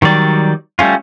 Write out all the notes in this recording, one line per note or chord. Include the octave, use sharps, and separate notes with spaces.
D#3 F#3 G3 D5
G3 A3 C#4 F4